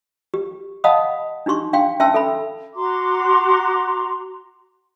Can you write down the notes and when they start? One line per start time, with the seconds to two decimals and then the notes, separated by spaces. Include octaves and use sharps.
0.34 G4
0.84 D#5 F5 F#5 A5 B5 D#6
1.46 D4 D#4 G4 C6 C#6
1.73 D4 F5 G5 C6
2.00 C#4 E5 G5 A5 C6 E6
2.14 A4 E5 B5
2.74 F#4 A#5 C6 D6